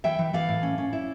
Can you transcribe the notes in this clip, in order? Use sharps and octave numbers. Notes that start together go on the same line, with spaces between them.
E3 E5 G5
E3
E3 D5 F5
A2
C#4
C#4
E4